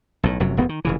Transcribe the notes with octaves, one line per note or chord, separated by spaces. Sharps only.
B1 A2
F1 F#2 C3 F#3
E1 G2 B3
D#3
F1 C#3 E3